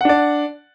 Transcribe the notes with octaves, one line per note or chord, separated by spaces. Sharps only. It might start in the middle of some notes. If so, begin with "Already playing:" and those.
D4 D5 F#5